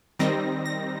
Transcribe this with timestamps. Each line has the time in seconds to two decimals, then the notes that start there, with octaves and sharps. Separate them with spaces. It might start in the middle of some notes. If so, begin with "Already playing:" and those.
0.19 D#3 G3 C4 D#4 A#6
0.66 A#6